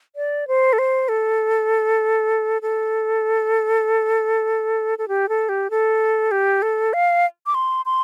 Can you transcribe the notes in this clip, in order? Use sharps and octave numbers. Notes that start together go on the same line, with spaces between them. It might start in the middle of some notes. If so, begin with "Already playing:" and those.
D5
C5
A4
C5
A4
A4
A4
G4
A4
G4
A4
G4
A4
F5
D6
C6
C6